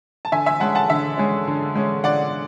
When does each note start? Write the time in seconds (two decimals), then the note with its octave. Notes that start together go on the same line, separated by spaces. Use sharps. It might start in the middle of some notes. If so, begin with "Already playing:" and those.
0.25 A5
0.32 D3 E5 G#5
0.46 E5 G#5
0.60 G#3 C#4 F#5 A5
0.75 F#5 A5
0.90 D3 E5
1.18 G#3 C#4
1.48 D3
1.75 G#3 C#4
2.04 D3 D5 F#5